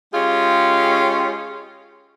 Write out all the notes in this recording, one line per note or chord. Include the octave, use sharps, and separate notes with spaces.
G#3 C#4 F4 G4 G#4